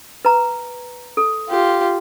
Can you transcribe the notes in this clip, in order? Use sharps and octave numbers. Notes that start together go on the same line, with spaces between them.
B4 A#5
A4
F4 G4